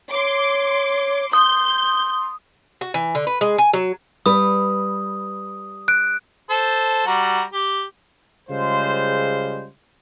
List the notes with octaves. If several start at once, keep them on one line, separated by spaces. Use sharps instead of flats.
C#5 C6 D6
C6 D#6 G6
F#4
E3
D3
B4
G#3
G#5
F#3
G3 B4 D#6
F#6 D7
A4 C5
G3 F#4 A#5
G4
C#3 G3 G#3 F4 C5